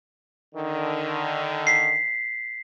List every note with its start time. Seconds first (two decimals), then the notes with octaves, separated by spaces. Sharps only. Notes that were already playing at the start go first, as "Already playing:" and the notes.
0.55 D3 D#3
1.67 B6 C7